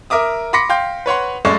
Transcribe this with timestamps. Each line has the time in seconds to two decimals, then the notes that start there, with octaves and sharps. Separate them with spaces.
0.10 A#4 E5 D6 D#6
0.53 B5 C6 D6 A#6 B6 C#7
0.69 F5 G5 C6 G6
1.06 B4 C#5 F#5 C6
1.45 F#2 G#3 A3 D5 C#6 A6